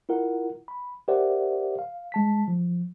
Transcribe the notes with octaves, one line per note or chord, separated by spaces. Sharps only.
E4 F4 A#4 F#5
B5
G4 A#4 C5 D5 E5 F#5
F5
G#3 A5 B6
F3